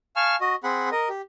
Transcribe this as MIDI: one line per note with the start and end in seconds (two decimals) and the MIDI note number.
0.16 0.36 77
0.16 0.36 80
0.16 0.36 81
0.16 0.36 85
0.16 0.36 89
0.41 0.55 66
0.41 0.55 75
0.64 0.89 60
0.64 0.89 68
0.64 0.89 78
0.64 0.89 83
0.92 1.09 70
0.92 1.09 75
1.09 1.22 67